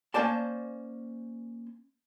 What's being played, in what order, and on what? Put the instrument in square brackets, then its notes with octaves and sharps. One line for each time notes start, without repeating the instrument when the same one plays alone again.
[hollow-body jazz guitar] A#3 C#4 C5 D5 A5